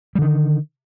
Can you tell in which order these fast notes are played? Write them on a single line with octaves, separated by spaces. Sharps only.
G3 D3 D#3